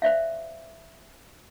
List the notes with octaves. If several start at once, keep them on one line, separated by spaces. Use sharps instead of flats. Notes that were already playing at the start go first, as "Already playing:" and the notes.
C5 D5 E5 F5